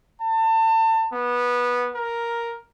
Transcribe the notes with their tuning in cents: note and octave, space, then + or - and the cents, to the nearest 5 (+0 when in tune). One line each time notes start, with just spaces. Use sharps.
A5 +30
B3 -15
A#4 +5